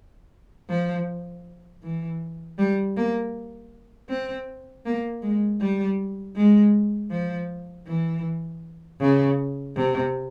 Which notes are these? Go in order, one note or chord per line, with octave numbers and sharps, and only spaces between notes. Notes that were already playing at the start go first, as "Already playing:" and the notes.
F3
E3
G3
A#3
C4
A#3
G#3
G3
G#3
F3
E3
C#3
C3